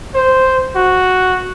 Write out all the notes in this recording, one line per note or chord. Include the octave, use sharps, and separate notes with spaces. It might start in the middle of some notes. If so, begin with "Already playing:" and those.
C5
F#4